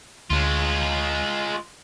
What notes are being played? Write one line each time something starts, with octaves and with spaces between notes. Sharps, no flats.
D2 G#3 F4